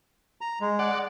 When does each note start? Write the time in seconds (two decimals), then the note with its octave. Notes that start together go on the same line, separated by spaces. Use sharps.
0.41 A#5
0.60 G#3
0.79 D5 F#5